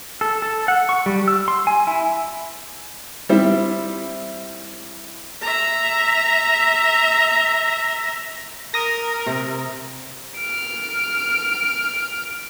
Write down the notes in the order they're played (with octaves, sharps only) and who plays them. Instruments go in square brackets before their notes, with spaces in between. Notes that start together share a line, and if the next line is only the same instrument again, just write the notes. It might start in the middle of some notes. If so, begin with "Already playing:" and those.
[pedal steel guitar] A4
A4
F#5
C#6
G3
E6
C6
G#5
E4
[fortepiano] G3 C4 E4
[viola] E5 A#5
[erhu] A#4 [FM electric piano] D#6 A#6
[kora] C3
[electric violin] F6 D7